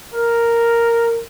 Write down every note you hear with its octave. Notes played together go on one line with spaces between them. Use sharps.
A#4